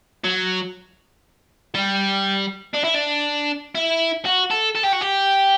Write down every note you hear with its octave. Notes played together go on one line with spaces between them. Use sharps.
F#3
G3
D4
E4
D4
E4
F#4
A4
A4
G4
F#4
G4